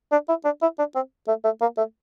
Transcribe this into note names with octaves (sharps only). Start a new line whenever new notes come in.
D4
E4
D4
E4
D4
C4
A3
A3
A#3
A3